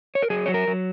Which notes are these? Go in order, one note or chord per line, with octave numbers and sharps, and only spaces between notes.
C#5
A#4
F#3 G#4
F#3 C#5
A#4
F#3